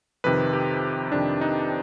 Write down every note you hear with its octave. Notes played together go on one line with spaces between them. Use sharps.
F2 C3 D#3 B4
G4
F2 C3 D#3 D4
D#4